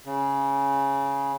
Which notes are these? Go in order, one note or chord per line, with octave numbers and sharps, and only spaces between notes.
C#3